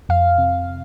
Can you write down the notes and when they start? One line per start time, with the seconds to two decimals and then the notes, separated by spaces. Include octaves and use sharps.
0.09 F2 F5
0.38 C3